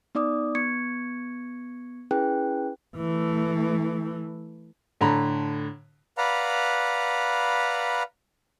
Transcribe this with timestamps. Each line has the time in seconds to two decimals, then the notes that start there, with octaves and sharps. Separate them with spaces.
0.15 B3 D#4 D5 D6 D#6
0.55 B3 C#6 G#6 C#7
2.11 C#4 E4 G#4 B4 G5 F#6
2.96 E3 A3
5.01 A2 D3 A#5 B5
6.18 B4 D5 F5 F#5 A#5 B5